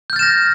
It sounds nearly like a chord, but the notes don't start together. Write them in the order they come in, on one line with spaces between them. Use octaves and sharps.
G6 F6 A6 E7 A#6